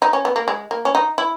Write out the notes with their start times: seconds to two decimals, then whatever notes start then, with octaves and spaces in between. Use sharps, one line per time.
0.02 D#4
0.13 C#4
0.25 B3
0.36 A#3
0.48 G#3
0.71 A#3
0.85 C#4
0.95 D#4
1.18 E4